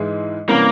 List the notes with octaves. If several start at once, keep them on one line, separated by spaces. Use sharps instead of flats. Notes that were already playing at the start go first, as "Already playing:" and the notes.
Already playing: G#2 E3 G#3 E4 G#4
C3 E3 G3 A#3 C#4